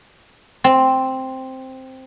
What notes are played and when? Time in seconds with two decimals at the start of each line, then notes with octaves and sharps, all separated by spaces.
0.64 C4